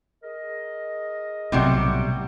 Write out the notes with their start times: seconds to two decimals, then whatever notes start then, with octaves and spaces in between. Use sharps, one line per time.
0.23 G#4 A#4 D#5
1.52 B1 A2 C3 F#3 G3 F#5